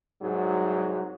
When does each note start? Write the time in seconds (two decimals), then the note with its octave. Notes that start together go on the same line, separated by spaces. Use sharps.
0.22 C2 G#2 F#3